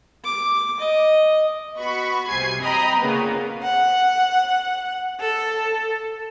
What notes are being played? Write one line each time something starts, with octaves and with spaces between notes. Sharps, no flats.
D6
D#5
B3 F#4 B5 C#6
C2 C3 G#5 G#6 C7
D#5 G5 A#5 B5 D#6
A#2 C#3 A#3 B3
F#5
A4